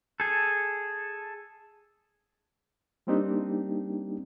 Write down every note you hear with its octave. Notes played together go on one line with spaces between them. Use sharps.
G#4 A4
G3 A#3 C4 D4 D#4 G4